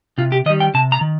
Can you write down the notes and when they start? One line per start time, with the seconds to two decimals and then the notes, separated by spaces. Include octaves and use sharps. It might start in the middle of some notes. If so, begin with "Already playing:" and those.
0.18 C3 F4
0.32 G4
0.46 D#3 D#5
0.50 G3
0.60 G5
0.74 C3 A5
0.92 A#5
1.01 D#3